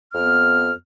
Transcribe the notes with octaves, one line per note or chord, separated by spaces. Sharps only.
F2 B3 F6